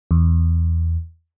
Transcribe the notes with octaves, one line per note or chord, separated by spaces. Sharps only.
E2